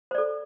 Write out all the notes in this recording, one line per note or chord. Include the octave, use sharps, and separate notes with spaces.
A4 C5 D5